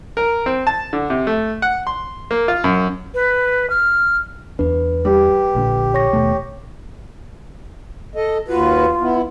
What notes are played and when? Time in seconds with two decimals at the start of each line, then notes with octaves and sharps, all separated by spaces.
0.17 A#4
0.46 C4
0.67 A5
0.93 D3
1.10 C3
1.27 A3
1.62 F#5
1.87 C6
2.31 A#3
2.48 F4
2.64 F#2
3.15 B4
3.70 F6
4.59 E2 D4 B4
5.05 G3 G4
5.55 A#1 A#2 D3
5.94 C#5 C#6 A#6
6.13 D#2 B2 A3
8.15 A4 D#5
8.48 D#2 F4 F#4 B4
9.01 B3 E4